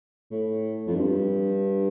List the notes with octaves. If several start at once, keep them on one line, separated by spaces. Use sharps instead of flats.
A2
F2
G2